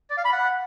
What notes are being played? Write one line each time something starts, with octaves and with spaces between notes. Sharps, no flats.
D5
F5
B5
F#5